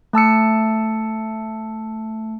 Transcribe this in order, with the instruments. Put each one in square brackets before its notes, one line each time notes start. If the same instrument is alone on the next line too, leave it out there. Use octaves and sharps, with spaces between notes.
[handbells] A3 A5 E6 C#7